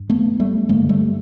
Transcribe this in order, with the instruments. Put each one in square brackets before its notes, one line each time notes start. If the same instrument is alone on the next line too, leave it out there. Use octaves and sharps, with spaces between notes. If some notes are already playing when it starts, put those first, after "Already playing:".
Already playing: [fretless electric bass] G2
A3 B3
G3 A3
G2 D3 G#3 A#3
G3 A3